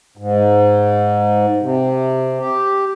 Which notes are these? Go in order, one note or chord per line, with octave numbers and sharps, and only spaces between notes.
G#2
C3
G4